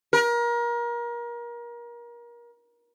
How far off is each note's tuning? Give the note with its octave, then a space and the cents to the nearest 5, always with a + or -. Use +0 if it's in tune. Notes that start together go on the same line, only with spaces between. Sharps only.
A#4 +30